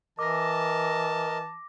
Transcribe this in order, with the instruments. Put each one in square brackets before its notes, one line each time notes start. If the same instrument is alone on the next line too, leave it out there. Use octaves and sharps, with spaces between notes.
[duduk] E3 [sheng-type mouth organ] A#4 D#5 [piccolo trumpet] A5 [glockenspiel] D6 A#6